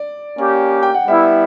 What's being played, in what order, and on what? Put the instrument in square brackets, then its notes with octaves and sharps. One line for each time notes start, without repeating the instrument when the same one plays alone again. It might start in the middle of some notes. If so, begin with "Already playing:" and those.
Already playing: [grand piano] D5
[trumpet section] A#3 C#4 G4
[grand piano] G5
F#5
[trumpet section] G3 B3 E4 [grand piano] E5